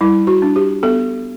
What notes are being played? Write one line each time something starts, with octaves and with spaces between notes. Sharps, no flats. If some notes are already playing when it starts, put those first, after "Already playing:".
G3 E4
F#4
D4
G4
B3 A4